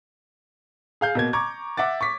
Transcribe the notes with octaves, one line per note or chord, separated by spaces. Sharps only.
G#4 F5 G6
B2 A#3 G#6
A#5 C#6 D6 G#6
E5 F#5 D6 A6
C#6 D6 B6